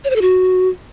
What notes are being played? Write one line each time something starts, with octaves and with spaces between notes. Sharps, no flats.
C#5
C5
A4
F#4